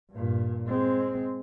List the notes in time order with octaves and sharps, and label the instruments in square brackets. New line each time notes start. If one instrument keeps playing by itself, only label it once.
[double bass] G2 A#2
G#3 C4